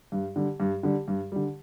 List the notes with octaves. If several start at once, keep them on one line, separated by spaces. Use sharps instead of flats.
G2
D3 G3
G2
D3 G3
G2
D3 G3